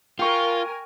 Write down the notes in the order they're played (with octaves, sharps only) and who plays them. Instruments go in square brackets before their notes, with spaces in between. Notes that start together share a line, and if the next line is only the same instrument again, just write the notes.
[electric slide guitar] F4 [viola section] A#4 G#5 [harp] G5 C#6